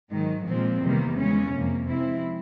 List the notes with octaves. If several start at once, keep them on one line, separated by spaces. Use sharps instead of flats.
G#2 D#3 F#3
A#2 F3 G#3 C4
E2 C3 D#3 G3 A#3
C#3 E3 G#3 C#4
F2 C3 F3 A#3
C3 F3 G#3 C4 E4